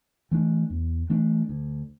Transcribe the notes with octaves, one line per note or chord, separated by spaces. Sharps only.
E3 A3 D4
E2
E3 A3 D4
D2